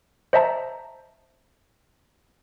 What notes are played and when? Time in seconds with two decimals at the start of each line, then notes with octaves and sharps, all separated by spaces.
0.33 C5 D#5 E5 A5 A#5